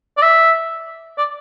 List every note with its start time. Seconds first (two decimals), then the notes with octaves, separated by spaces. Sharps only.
0.17 D5
0.22 E5
1.18 D5